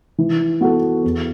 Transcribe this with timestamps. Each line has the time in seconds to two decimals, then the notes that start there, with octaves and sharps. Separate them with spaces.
0.18 E3
0.61 B3 F#4 A4
1.04 E2